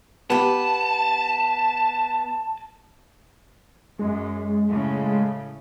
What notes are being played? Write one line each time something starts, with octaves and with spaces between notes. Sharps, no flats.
B3 G4 A5
F#2 G#3
A2 C#3 A3